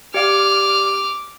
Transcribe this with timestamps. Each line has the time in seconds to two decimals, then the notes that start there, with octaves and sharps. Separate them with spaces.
0.14 G4 D5 F5 D6 F6